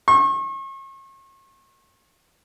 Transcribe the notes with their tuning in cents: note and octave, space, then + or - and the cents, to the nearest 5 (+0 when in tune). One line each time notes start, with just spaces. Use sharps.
C#6 -40